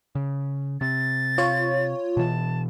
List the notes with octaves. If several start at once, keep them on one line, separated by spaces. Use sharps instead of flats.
C#3
C3 A6
F4 C#5
B2 E3 A5